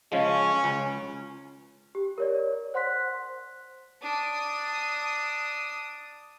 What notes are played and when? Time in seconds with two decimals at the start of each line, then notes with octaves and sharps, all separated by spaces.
0.12 C#3 F3 G#3 C#4
0.64 C#2
1.95 G4
2.18 A#4 C#5 D5
2.74 C5 F#5 C6 F#6 B6
4.02 D4 D#6